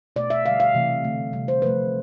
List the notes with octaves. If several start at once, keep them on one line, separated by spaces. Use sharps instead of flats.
B2 A3 D5
E5
D3 G3 F5
F5
C3 E3 A3
D3 A3
C3 G3
C5
C3 F3 A3 B4